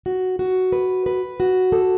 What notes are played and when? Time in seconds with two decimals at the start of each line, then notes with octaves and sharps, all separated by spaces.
0.06 F#4
0.39 F#4
0.72 B4
1.06 B4
1.40 F#4
1.72 A4